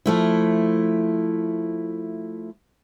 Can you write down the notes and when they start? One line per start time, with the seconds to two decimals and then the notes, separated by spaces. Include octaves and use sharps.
0.06 F3 A3 E4